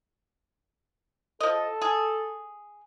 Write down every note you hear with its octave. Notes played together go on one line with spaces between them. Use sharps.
F3 A4 D#5
G#4